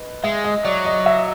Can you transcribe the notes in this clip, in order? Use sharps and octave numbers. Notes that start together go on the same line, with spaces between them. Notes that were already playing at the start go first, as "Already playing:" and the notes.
Already playing: B4 D#5
G#3 E5
D#5
F#3 D5
D#5
E5